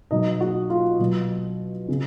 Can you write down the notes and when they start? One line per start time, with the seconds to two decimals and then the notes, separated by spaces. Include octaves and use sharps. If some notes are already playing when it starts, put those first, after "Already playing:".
0.11 B2 F#3 D#4 D#5
0.40 F#4
0.70 F4
0.99 B2 F#3
1.89 C#3